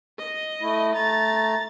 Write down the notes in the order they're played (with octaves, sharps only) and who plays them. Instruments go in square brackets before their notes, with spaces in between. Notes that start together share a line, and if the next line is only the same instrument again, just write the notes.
[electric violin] D#5
[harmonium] A3 E4
[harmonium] A3 A#5 [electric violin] A6